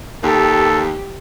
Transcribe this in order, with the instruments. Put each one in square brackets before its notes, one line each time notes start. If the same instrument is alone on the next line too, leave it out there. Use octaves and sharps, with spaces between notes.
[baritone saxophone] D#2 [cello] G4 [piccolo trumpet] A4